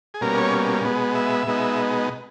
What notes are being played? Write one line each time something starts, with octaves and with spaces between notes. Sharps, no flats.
G#4
B2 G3 A#3 C#4 A#4
C#5
B2 G#3 B3
E5
B2 G#3 B3 D#4